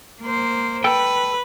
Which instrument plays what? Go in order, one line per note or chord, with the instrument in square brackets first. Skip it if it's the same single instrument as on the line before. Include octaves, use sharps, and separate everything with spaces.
[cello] A#3 C5
[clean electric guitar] A4 G5 [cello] B4